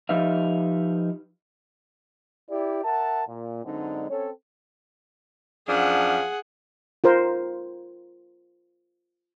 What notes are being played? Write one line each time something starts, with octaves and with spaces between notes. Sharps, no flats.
F3 D#4 G4 B4 E5 F5
E4 G4 D5
A#4 E5 F#5 A5
A#2
F#2 D3 G#3 C4 D4 D#4
C4 C#4 A4 C#5
F#2 F3 D4 G#4 F#5
F4 A#4 C5